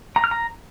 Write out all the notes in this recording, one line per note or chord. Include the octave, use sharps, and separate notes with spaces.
A#5
F6
A#5